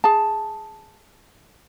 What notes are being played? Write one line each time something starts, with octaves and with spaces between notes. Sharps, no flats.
G#4 A5